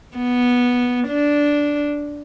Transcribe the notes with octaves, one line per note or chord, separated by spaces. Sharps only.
B3
D4